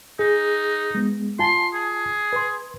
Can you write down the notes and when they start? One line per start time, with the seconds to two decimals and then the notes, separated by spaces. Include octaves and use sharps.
0.19 D#4 G#4
0.95 G#3 B3
1.39 F4 G#5 A5 C6
1.74 G#4
2.33 B4 C6